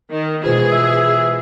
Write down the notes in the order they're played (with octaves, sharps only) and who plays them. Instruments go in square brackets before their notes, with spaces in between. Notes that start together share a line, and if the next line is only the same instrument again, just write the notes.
[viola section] D#3
[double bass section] B2 E3 G#3 [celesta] F4 B4 C5 [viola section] G#4
[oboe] E5